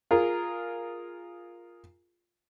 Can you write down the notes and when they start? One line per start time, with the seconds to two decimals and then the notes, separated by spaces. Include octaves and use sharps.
0.11 F4 G#4 A#4